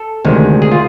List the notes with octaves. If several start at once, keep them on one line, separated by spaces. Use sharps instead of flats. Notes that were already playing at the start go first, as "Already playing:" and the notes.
Already playing: A4
D2 C3 D#3 G#3
G#4
F4